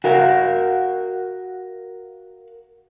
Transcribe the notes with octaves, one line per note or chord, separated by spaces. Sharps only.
F#4 A#4 F5